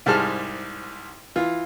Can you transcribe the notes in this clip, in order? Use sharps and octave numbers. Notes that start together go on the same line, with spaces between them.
C2 G#2 G3 G#4 A5 F6
E3 F4